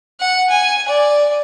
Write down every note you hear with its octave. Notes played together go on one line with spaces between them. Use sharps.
F#5
G#5
D5